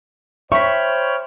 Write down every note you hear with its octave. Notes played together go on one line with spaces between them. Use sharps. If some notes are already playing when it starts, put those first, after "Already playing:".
C5 C#5 E5 G5 B5 C#6 F6 B6